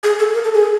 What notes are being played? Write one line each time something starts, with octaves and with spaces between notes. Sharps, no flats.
G#4
A4
A#4
A4
G#4